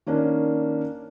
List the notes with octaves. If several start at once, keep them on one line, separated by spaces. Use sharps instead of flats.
D#3 A#3 C#4 D4